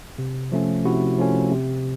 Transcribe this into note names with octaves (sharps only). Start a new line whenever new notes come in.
C3
F3 A3 C#4
C3 E4 F#4
F3 A3 C#4
C3